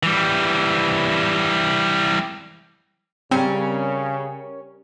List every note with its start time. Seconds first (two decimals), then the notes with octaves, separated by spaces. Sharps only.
0.03 E3 G3
3.31 C#3 G3 C4 C#4 A#4